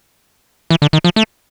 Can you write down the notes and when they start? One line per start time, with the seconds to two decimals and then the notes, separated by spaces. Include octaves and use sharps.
0.70 E3
0.82 D3
0.93 D#3
1.04 F3
1.16 A3